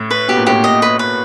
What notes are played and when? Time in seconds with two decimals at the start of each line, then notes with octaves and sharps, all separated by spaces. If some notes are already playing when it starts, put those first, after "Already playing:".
Already playing: A2
0.11 B4
0.28 B2 G4
0.37 A#2
0.46 A2 G4
0.57 A#2
0.64 D#5
0.82 B4
0.99 B4